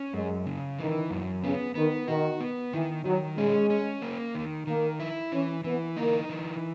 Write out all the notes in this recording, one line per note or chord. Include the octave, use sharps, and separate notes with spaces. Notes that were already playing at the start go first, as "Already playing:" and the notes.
Already playing: C#4
F#2 G#3
C#3
D#3 E3
F#2
C#3 B3
D#3 B3
D#3 F#4
B3
D#3 E3
D#3 F#3
G#3 C#4
C#4
A#3
D#3
D#3 A#3
E4
E3 C#4
E3 B3
A#3 D#4
E3